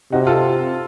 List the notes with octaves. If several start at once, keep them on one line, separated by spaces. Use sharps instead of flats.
C3 D#4 F#4
F4 A4